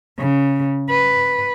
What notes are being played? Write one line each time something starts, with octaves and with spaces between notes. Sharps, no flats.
C#3
B4